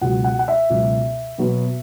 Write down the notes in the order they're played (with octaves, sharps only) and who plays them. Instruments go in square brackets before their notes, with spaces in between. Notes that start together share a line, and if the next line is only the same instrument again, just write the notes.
[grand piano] C#2 B2 F#3 F#5
F#5
F#5
E5
C#2 B2 F#3
B2 F#3 B3